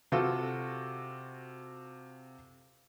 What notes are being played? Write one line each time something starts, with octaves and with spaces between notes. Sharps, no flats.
C3 F4 F#4 A4